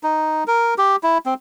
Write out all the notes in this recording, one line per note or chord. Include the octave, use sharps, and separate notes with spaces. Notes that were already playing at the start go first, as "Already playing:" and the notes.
D#4
A#4
G4
E4
C4